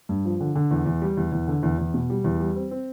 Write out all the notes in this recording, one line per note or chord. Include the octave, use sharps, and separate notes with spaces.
G2
F3
D3
D3
E2
E2
G3
E2
E2
D3
E2
E2
B2
G3
E2
G3
C4
C4